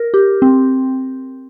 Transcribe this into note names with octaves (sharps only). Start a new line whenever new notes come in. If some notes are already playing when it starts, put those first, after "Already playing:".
Already playing: A#4
G4
C4